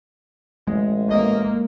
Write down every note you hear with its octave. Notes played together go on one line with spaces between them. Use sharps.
A1 G#3
A#3 D#5